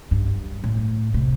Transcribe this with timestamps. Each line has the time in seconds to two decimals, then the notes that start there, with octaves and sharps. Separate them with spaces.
0.11 G2
0.64 A2
1.14 C3